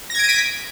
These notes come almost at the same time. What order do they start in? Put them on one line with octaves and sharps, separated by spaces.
A#6 G#6 D7 D#7 B6